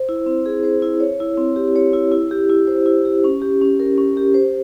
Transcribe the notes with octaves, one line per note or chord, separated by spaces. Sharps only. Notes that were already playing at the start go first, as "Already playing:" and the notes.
Already playing: C5
E4
C4
G#4
C5
E4
C#5
E4
C4
G4
C#5
E4
E4
G4
E4
C5
E4
G4
C#4
G4
C#4
A#4
C#4
G4
C5